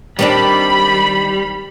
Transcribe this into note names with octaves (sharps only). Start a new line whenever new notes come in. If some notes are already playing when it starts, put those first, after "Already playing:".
D#3 G3 C4 D4 B5